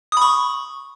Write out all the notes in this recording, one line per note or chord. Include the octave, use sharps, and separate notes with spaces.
B5 C#6 D#6